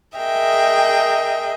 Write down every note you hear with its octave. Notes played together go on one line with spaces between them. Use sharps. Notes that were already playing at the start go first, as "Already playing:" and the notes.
G#4 A#4 D#5 E5 G5